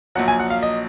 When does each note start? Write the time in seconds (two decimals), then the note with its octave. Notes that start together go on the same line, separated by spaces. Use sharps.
0.15 A#1 A#2 F#3 F#5
0.28 G#5
0.39 F#5
0.50 F5
0.62 D#5